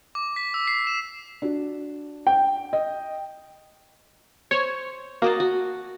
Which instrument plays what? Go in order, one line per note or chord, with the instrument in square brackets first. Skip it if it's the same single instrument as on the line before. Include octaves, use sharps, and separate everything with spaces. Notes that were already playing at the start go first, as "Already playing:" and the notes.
[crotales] D6
B6
E6
C7
E7
[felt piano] D4 F#4
[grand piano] G5
[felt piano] D#5
[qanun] C5 C6 [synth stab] C#5
[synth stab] A#3 [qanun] F#4 D#5 A5
[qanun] F#4